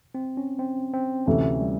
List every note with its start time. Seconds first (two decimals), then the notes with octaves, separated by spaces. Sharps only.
0.15 C4
0.37 C#4
0.59 C4
0.94 C4
1.26 D2 C3 E3 A3 C#4
1.61 G3